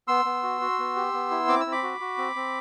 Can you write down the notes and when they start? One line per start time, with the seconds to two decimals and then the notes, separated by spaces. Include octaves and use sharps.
0.08 B3 C6 E6
0.25 B3
0.43 F#4
0.61 F#4
0.79 B3
0.96 G4
1.13 B3
1.31 E4
1.48 C4 D6
1.60 E6
1.66 C4
1.72 B5 D6
1.83 F#4
2.00 F#4
2.18 C4
2.36 C4